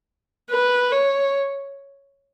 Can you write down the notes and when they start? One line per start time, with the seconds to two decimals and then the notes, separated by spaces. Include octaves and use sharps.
0.51 B4
0.92 C#5